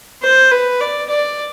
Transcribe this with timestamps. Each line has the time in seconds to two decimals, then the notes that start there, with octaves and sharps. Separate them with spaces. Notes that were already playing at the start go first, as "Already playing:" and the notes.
0.23 C5
0.51 B4
0.81 D5
1.10 D5